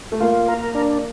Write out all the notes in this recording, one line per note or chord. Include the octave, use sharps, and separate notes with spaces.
A3
A#3 F4
A#4
D4